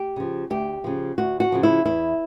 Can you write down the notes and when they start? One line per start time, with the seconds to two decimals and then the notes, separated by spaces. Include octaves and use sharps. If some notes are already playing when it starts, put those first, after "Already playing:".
Already playing: G4
0.16 C#3 F3
0.50 D2 G4
0.84 C#3 F3
1.18 D2 F#4
1.40 F#4
1.52 C#3 F3
1.63 E4
1.85 E2 E4